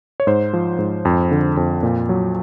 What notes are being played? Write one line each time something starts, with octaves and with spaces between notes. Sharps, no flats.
C#5
G#2 C5
F3
G#2
F2
D3
F2
A#2
F#3